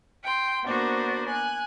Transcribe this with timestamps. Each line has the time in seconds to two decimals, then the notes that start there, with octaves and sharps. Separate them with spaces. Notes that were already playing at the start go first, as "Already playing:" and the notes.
0.23 G5 C6
0.65 A#3 B3 D4 F#4 C5
1.28 G#5 F#6